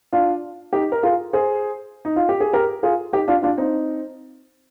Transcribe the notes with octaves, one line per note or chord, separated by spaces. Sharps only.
D4 F4
D#4 G4
A#4
F4 G#4
G#4 C5
D#4
F4
G4
G#4
G4 A#4
F4 G#4
D#4 G4
D4 F4
D4 F4
C4 D#4